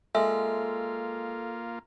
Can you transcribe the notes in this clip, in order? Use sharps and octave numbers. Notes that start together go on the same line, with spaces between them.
G#3 A#3 F4 A4 E5